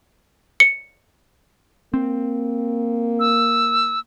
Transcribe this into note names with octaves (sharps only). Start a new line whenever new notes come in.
C#7
A#3 C4
E6